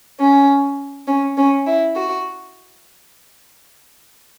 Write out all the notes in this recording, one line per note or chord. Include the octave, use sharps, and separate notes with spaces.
C#4
C#4
C#4
E4
F#4